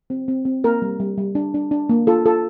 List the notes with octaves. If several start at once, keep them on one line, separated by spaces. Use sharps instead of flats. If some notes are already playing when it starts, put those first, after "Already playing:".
C4
C4
C4
A#3 A#4
G3
G3
G3
D4
D4
D4
A#3
F4 A4
F4 A4